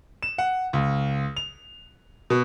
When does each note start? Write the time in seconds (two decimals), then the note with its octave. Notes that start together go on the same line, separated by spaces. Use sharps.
0.23 E7
0.38 F#5
0.73 C#2
1.37 F7
2.30 B2